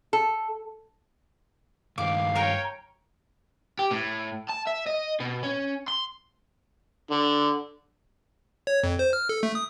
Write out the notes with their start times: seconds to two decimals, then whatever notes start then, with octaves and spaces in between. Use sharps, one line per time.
0.13 A4
1.98 G2 D#3 F5 D6
2.35 A#4 C#5 G5 G#5 A#5
3.79 G4
3.91 A2
4.49 A5
4.67 E5
4.86 D#5
5.20 B2
5.43 C#4
5.88 C6
7.11 D3
8.67 C#5
8.83 F2
8.99 C5
9.13 F6
9.29 A4
9.43 A3
9.55 D#6